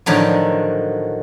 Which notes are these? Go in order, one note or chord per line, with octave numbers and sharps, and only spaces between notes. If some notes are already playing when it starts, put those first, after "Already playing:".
A2 D3 D#3 F3 F#3